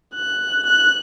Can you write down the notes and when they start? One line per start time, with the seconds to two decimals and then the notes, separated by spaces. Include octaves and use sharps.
0.15 F#6
0.66 F#6